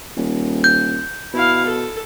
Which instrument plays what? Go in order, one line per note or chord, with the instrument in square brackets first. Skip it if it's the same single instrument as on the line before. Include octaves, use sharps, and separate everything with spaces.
[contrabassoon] D#1
[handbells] G6
[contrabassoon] B2 [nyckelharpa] E4 F5
[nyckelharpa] A4